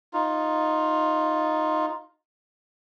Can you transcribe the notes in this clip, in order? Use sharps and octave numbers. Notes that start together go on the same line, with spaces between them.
D#4 F4